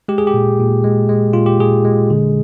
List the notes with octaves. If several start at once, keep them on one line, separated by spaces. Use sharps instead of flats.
G#3 G4
G#4
G4
A#2
A#2
G#3
G#3
A#2 F4
G4
A#2 G#4
G#3
D3